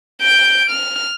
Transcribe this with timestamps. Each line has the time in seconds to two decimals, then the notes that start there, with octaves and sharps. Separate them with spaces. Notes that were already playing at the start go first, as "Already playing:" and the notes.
0.22 G6 D7
0.70 F6